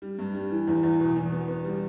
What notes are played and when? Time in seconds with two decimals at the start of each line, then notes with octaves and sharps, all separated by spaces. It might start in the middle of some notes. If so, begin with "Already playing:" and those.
0.02 G3
0.19 G2
0.35 G3
0.51 E3
0.68 E2
0.83 E2
1.00 B2
1.16 E2
1.32 B3
1.48 B3
1.64 G3